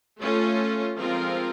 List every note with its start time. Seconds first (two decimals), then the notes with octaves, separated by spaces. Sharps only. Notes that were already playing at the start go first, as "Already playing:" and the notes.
0.20 A3 C#4 F4 A4
0.98 F3 G#3 C4 F4 A#4